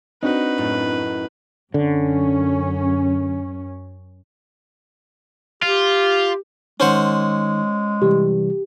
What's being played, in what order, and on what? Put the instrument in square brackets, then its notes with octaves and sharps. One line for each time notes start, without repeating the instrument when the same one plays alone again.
[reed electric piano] C4 D4 [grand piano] D#4 F#4 [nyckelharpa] B4
[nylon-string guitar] F#2 A2 C#4
[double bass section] F#2 C#4 [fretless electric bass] D3
[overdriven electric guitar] F4 [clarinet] G4
[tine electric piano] D#3 D#4 [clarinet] G#3 [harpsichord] C#4 C5 F#5
[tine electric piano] C3 E3 G3 [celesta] G4